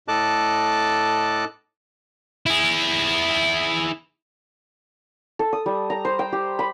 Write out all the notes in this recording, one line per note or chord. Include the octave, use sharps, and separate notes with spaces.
A2 A4 D#5 A5 D6 F#6
E4 G#4
A4
D#6
G3
A#5
C5
G5
G4
B5